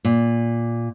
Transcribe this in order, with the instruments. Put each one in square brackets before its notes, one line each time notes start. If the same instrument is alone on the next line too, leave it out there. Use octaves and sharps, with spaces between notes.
[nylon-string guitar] A#2